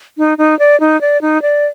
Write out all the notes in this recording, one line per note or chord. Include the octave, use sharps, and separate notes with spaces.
D#4
D#4
D5
D#4
D5
D#4
D5